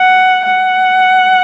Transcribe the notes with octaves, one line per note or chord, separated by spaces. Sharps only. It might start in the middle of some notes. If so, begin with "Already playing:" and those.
Already playing: F#5
F#5